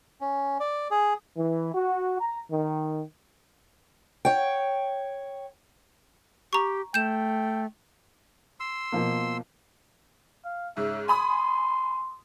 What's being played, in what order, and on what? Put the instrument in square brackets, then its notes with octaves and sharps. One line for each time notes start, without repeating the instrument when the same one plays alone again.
[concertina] C#4
D5
G#4
[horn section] E3
F#4
A#5
D#3
[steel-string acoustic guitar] C#5 G5
[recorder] G4 [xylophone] A#5 C#6
[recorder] A3 [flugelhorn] G5 [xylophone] G6 E7
[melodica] C6 E6
[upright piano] B2 F3 A#3
[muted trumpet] F5
[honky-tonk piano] G#2 C#3 [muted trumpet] E5
[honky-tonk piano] G#5 B5 D#6 [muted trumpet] C6